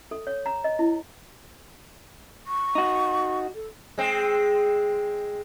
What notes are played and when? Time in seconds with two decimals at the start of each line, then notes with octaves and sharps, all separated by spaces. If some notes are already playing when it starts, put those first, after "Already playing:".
0.11 A4
0.27 C#5
0.46 A#5
0.64 D#5
0.79 E4
2.47 C#6
2.75 D#4 F#4
3.55 A4
3.98 G#3 C4